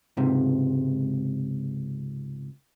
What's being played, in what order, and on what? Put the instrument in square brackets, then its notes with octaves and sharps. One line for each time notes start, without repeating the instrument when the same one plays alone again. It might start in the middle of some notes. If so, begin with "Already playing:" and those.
[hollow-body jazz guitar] C#2 G#2 C3